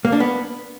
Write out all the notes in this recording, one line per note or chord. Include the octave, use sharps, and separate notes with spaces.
A#3
D4
B3